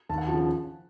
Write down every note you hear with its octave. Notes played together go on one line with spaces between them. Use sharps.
D#2 A5
F#5
F3 A5
C#3